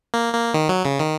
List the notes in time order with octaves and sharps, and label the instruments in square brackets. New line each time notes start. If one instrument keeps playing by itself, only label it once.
[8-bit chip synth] A#3
A#3
D#3
F#3
C#3
D#3